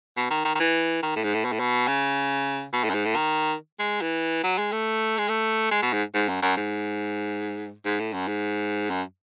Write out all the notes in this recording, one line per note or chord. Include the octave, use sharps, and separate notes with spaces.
B2
D#3
D#3
D#3
E3
D#3
A2
G#2
A2
B2
A2
B2
C#3
B2
A2
F#2
G#2
A2
D#3
G#3
E3
F#3
G#3
A3
G#3
A3
G#3
B2
G#2
G#2
F#2
F#2
G#2
G#2
A2
F#2
G#2
F#2